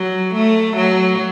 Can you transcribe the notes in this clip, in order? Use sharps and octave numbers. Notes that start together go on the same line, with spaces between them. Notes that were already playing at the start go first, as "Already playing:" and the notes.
Already playing: F#3
A3
F#3